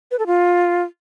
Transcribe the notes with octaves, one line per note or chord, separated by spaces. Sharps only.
B4
A4
F4